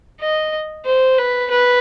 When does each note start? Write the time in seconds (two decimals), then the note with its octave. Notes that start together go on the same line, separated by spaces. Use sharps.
0.21 D#5
0.85 C5
1.18 B4
1.51 B4